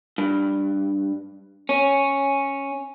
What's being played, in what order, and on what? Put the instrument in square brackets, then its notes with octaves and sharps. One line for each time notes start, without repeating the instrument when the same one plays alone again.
[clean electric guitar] G2
C#4